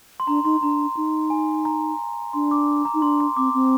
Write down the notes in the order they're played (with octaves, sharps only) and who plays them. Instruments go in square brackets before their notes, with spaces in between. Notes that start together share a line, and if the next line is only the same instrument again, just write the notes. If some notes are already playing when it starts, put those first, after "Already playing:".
[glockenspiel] C6
[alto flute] D4 [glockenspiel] A#5
[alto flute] D#4 [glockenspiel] C6
[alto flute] D4 [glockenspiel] A#5
[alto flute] D#4
[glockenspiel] G#5
A#5
[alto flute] D4 [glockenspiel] C6
[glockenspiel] D6
A#5
[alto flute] D#4
[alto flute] D4 [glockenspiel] C6
[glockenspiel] C6
[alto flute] C4 [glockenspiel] D6
[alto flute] C4